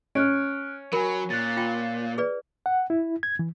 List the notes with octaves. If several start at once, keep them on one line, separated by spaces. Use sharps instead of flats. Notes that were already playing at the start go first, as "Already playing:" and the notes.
C#4 F6 F#6 D7
F#3 A#4 G#5 B5
A#2 F#6 A6
F4 G5
G#4 B4 D5
F#5
E4
G#6
E3